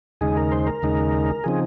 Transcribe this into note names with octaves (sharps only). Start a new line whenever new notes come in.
D#2 C#3 G#3 D#4 G#4
A#4
C5
A#4
D#2 C#3 G#3 D#4
C#3 F3 C4 D#4 G#4